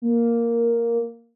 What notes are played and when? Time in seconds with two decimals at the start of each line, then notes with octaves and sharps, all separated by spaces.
0.02 A#3